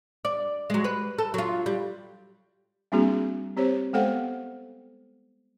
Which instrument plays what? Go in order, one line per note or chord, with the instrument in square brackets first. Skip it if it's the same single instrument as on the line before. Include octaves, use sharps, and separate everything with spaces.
[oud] D5
F#3 G#3
B4
A4
F#3 F4
G3
[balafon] G3 A#3 C4 D4 F#4 G#4
C4 G4 C5 C#5
G#3 B3 A4 C5 F5 F#5